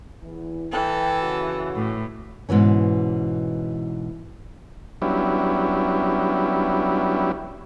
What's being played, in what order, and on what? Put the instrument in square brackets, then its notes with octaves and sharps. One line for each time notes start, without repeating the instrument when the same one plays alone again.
[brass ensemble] E2 E3
[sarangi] E3 [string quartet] A4 [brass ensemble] G5
[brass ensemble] C#3 F#4
[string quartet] A2
[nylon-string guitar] G#2 B2 E3 C#4
[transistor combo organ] F#3 G3 B3 C#4 D4 E4